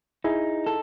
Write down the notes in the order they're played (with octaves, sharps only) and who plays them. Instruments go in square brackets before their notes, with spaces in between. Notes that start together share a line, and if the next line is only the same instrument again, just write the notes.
[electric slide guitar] D#4 [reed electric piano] E4 G#4
[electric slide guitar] A4